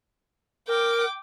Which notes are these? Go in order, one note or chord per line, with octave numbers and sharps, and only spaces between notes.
A#4 G5 D6